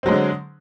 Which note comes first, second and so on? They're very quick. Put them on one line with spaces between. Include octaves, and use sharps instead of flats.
C4 F#3 G#3 D3